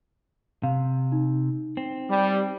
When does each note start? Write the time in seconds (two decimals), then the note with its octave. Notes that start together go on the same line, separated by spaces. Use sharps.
0.63 C3 F5
1.12 D#4
1.77 C4
2.09 G3